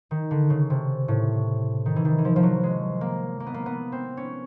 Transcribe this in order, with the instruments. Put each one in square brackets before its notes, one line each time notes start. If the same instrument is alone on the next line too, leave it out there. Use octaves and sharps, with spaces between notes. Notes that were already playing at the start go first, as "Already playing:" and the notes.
[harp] D#3
D3
C#3
C3
A2
D#3
E3
D#3
E3
F3
F3
F#3
G#3
A#3
A#3
B3
A#3
B3
C4
C#4